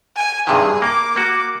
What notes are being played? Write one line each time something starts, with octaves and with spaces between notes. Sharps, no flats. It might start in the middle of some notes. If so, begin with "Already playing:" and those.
G#5
G2 C3 D#3 G#4
A#3 D6
A#3 F#4 D6